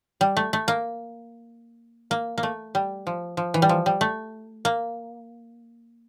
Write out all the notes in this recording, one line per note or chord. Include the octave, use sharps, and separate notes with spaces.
G3
A3
A3
A#3
A#3
A#3
A3
G3
F3
F3
E3
G3
F3
G3
A3
A#3